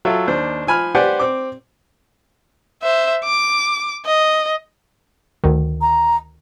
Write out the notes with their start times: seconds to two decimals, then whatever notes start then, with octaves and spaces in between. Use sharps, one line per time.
0.05 F#3 F4 A4 E5
0.27 D#2 D4 C5
0.67 F3 G#5 B5 F6
0.95 G4 B4 C5 D5 F#5 G#5
1.19 C4 D6
2.82 C5 E5
3.24 D6
4.05 D#5
5.44 D2 D#3
5.81 A#5